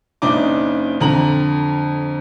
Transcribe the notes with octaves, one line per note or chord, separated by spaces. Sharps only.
F#1 C#3 D4 D#4 D6
F2 D3 A#5 F#7